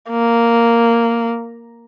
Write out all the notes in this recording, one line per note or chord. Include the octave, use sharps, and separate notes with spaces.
A#3